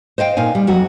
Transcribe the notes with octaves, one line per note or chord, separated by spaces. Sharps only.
C5 D#5 F5 G5
A#2 D#4 F5 G#5
G3
F2 F#3 F#4